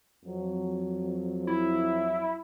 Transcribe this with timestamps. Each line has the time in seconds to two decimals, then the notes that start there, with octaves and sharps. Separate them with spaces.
0.24 F2 F#3
1.47 E4